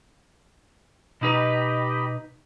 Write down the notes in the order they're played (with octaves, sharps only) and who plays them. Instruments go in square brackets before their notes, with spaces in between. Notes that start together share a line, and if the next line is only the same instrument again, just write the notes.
[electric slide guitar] B2 D#4 B4 [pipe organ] G4 D#5 B5